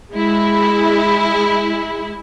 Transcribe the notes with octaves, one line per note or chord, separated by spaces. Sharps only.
G#3 E4